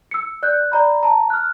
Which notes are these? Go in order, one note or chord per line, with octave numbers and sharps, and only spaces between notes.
E6 C#7
D5 F#6 G6
D5 A#5 B5
A5 A#5
F6 F#6